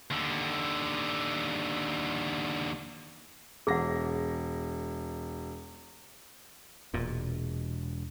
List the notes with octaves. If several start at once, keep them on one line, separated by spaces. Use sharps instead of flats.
D#2 D3
E1 G#4 F#5 A#6
E1 A#2